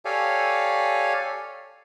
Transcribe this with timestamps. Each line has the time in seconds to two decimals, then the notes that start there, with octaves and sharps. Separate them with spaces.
0.05 G4 A4 C#5 D5 F5 G#5